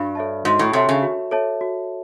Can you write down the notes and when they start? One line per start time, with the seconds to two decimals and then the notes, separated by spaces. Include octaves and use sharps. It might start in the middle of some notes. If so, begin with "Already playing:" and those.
Already playing: G2 F#4
0.15 A4 C#5 E5 A5
0.45 G#2 F#4
0.59 A2
0.73 C3 A4 C#5 E5 A5
0.89 C#3
1.03 F#4
1.31 A4 C#5 E5 A5
1.61 F#4